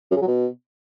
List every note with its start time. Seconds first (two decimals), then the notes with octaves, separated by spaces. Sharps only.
0.11 F#2
0.16 C#3
0.22 F#3
0.27 B2